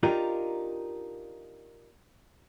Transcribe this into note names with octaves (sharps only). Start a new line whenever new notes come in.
D4 D#4 F4 G4 A#4